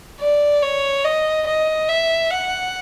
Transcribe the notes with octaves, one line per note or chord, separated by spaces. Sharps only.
D5
C#5
D#5
D#5
E5
F#5